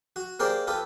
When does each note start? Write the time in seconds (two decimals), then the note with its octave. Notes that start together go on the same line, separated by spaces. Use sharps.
0.16 F#4
0.40 A#3 G4 G#4 A#4 C5 D5
0.67 F4 G4 A4 B4